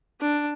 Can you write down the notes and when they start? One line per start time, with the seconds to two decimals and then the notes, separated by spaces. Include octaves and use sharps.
0.21 D4